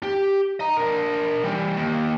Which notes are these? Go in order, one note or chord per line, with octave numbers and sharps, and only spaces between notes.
G4
D#5 A#5
D4 A#4
E3 G3
D#2